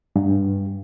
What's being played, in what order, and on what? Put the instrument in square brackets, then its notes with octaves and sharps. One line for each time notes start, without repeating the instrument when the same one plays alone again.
[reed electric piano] G2